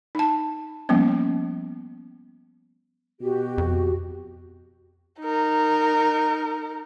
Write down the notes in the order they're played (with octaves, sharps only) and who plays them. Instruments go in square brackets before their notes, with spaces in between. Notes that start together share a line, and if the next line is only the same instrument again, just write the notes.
[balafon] D#4 A5
F3 G3 A#3 B3 C#4
[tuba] B2 [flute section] F#4 G4
[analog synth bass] F2
[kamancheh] D#4 A#4